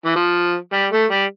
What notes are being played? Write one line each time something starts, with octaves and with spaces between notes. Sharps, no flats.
E3
F3
G3
A3
G3